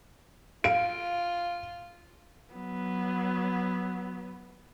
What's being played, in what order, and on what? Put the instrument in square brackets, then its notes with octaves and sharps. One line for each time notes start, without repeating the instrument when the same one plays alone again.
[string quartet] F4 [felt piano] F5 D7
[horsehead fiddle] F#3 B3